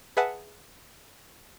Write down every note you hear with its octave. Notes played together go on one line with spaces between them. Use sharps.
G#4 B4 E5 F#5 G#5 A5